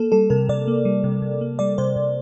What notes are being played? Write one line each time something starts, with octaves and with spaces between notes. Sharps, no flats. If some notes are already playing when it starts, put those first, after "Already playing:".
Already playing: A#3 A4
G3 A4
C3 A#4
C3 D5
A#3
G3
C3
C3
A#3
G3 D5
C3 C5
C3